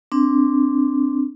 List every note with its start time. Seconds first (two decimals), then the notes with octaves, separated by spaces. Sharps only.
0.12 C4 D4